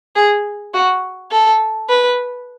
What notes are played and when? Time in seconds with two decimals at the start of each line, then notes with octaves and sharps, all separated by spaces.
0.16 G#4
0.74 F#4
1.31 A4
1.89 B4